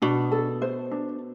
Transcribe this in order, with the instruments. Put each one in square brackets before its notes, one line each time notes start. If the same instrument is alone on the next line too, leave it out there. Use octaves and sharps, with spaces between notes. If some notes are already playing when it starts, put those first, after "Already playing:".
[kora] B2 [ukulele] D4
[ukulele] A4
C5
D4